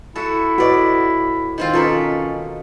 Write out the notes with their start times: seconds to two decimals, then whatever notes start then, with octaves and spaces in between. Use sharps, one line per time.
0.16 E4 F#4 A4
0.58 A2 F#4 B4 D5 D#5
1.58 D#3 C4 F4
1.74 B2 C#4 F4 A4 A#4 B5